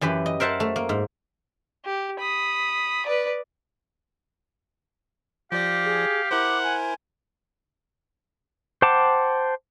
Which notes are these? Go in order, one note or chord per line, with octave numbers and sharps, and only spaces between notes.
F#2 E3 G4 B4
D#5
A#4 C5 E5 F#5 A5
A3
A#3
G#2
G4
B5 D#6
B4 D5
F3 G4 D5 F5 A#6
G#4
E4 A#4 C5 F#5 D6
G#5
C5 F#5 G5 A5 D6